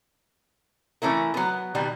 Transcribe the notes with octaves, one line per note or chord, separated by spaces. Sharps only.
E3 A3 C#4 E4 A#4
F#3 B3
B2 D#3 G3